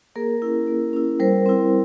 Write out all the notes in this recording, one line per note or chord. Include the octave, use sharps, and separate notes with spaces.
A#3 G#4 A#4
C#4 E4
A#3
C#4 E4
G3 A#4 C5
C4 E4